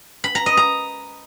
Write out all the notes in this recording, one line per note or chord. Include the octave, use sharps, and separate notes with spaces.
B5
A#5
D#5
A#5